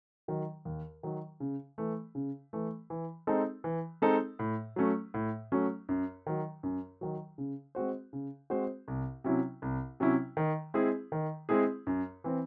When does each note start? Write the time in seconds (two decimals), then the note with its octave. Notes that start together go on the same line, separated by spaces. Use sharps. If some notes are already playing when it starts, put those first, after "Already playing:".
0.28 D#3 F#3
0.65 D#2
1.03 D#3 F#3
1.40 C#3
1.78 E3 A3
2.15 C#3
2.53 E3 A3
2.90 E3
3.27 G#3 C4 D#4 A4
3.64 E3
4.02 G#3 C4 D#4 A4
4.39 A2
4.76 F#3 A3 C#4
5.14 A2
5.52 F#3 A3 C#4
5.89 F#2
6.27 D#3 F#3
6.63 F#2
7.01 D#3 F#3
7.38 C#3
7.75 G#3 C4 F#4 C5
8.13 C#3
8.50 G#3 C4 F#4 C5
8.88 C2
9.24 C3 F#3 C#4 E4
9.62 C2
10.00 C3 F#3 C#4 E4
10.37 D#3
10.74 G#3 C4 E4 G#4
11.12 D#3
11.49 G#3 C4 E4 G#4
11.87 F#2
12.24 E3 C4